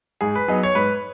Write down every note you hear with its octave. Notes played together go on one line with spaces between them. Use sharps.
G#2 G#4
B4
F#3 B3 D#4 G#4
C#5
G#2 B4